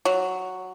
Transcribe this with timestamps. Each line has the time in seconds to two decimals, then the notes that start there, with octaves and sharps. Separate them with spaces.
0.05 F#3